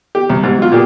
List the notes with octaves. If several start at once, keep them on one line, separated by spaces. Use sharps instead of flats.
G4
C2
G#2 C3
F#3 F4
A#2 A#3 G4 G#4